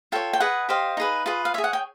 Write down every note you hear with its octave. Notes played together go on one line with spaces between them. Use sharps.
F4 A4 C#5 G5
G5
G#4 B4 D#5 F#5
G4 C5 D#5 F5
D#4 G#4 B4
F4 G#4 B4
F5
G#4 C#5 E5
F#5
G5